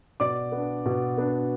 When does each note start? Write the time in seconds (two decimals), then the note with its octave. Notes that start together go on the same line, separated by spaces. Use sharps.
0.20 B2 D5 D6
0.52 B3
0.57 D4
0.86 B2
1.18 B3 D4